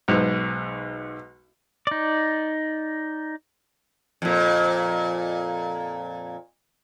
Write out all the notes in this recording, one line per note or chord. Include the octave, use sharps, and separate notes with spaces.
B1 G#2
D#4 D5
F2 A#2